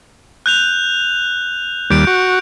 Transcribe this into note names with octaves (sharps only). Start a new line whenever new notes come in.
F#6 G6 F7
D#2 G3 G6 D7
F#4